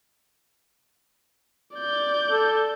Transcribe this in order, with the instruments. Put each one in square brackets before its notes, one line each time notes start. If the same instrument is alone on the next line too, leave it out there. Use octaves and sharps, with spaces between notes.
[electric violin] D5 G6
[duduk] A4